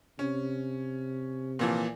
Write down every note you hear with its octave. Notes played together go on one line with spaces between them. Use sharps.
C3 C#4
A#2 E3 F3